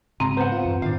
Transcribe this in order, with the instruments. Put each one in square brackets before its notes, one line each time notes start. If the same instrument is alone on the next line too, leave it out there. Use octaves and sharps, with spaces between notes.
[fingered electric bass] G#2 C#3 [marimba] C4 [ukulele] A#5
[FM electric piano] B3 [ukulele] C5 F#5
[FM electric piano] F4
[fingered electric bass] F#2 E3
[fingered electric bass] F#2 A2 D#3 [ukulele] D4 F5